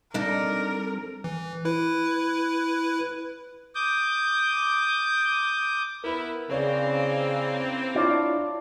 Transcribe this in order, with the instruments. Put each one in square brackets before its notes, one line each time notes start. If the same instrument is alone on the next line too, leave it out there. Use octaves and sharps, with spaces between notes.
[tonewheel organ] G3 C4 A4 [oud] D4 D#4 [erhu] A#4
[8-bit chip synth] E3
E4 B4
[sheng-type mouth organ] D6 D#6 G6
[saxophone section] B3 E4 [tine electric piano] A#4 B4
[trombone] C#3 [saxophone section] E3 A#3 C4 [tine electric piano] C#4 C#5 D5
[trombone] D4 [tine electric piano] E4 C#5 D6 [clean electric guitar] F4 D5